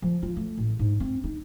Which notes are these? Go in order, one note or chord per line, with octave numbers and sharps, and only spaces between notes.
F3
F4
A3
A1
G#2
C4
D#4